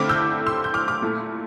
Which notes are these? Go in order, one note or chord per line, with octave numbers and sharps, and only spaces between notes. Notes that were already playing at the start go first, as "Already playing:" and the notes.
Already playing: D3 A3 C4 E4 D6 F6
E6 G6
C6 E6
G6
D6 F6
D6 F6
A#2 A3 E4